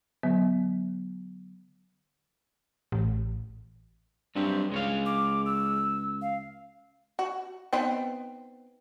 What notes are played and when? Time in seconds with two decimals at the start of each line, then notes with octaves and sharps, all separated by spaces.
0.23 D3 F#3 B3
2.92 A1
4.36 G2 F#3 C4 G4
4.72 C#2 G#3 C#5 F5
5.06 D6
5.46 E6
6.22 F5
7.19 F#4
7.73 B3 C4 D#4